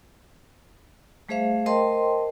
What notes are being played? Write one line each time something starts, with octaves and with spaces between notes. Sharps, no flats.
G3 A3 G#4 C5 E5 F5
A#4 C5 D#5 G5 A5 C6